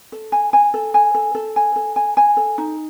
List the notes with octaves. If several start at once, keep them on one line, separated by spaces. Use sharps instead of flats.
A4
G#5
G#5
A4
G#5
A4
A4
G#5
A4
G#5
G#5
A4
D#4